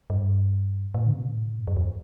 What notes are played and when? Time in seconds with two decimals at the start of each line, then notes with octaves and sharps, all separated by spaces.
0.10 G2
0.94 A2
1.06 D3
1.13 C3
1.20 B2
1.27 A2
1.59 G2
1.67 F#2
1.77 E2